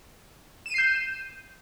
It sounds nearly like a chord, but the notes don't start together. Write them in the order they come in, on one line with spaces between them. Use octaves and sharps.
E7 D#7 C7 G6